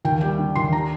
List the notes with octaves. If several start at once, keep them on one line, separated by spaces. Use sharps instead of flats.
D#2 G5
G3 G5
D3
D#2 C6
D4 A#5